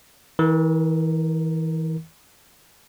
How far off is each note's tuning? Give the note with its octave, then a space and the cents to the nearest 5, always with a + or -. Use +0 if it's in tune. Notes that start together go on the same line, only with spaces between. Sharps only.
E3 -35 A#4 +0